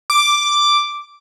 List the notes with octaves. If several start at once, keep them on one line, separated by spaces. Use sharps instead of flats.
D6